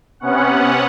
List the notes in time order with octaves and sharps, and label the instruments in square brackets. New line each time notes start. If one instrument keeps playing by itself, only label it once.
[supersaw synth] C3 B3 C#4 F#5